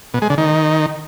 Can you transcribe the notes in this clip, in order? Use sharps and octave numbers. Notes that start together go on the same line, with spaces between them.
B2
G#3
D3
D#3